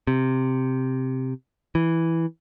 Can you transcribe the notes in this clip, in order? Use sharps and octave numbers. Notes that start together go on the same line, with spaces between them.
C3
E3